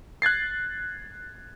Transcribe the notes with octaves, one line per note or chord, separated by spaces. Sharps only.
F#6 G#6 A6 C7